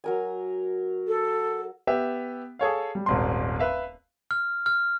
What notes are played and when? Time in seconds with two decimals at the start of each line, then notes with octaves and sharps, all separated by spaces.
0.04 F#3 A#4 G#5
1.08 A4
1.87 B3 G4 E5
2.59 G#4 A4 C#5 F5
2.95 G3
3.06 D#1 G#1 C6
3.59 B4 E5 F5
4.31 F6
4.66 F6